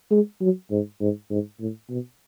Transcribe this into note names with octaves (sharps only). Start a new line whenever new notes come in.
G#3
F#3
G#2
G#2
G#2
A2
B2